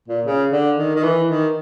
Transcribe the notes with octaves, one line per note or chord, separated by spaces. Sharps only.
A#2
C#3
D3
D#3
D#3
E3
D#3